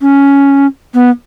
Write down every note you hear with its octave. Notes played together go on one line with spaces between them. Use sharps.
C#4
B3